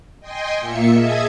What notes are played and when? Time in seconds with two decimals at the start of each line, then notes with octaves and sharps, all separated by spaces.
0.20 D#5 G5 G#5 C6
0.59 A#2 A#3 F4 E5 C#7
0.92 G#4 D#5 E5 A5 G#6